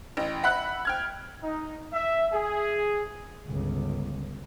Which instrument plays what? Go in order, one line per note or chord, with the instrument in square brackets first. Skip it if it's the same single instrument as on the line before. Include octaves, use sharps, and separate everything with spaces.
[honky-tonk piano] A1
E5 F#5 B5 F#6
G5 F6 G#6
[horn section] D#4
E5
G#4
[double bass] G1 C#2